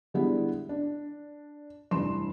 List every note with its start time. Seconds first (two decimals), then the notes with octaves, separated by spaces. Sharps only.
0.14 D3 G3 G#3 B3 E4
0.69 D4
1.91 F1 G2 E3 C6 E7